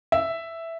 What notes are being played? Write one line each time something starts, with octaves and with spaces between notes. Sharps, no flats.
E5